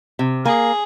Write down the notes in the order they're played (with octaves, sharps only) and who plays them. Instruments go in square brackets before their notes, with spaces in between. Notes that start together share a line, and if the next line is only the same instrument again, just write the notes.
[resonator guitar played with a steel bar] C3
[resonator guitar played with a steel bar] A#3 [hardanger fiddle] G#4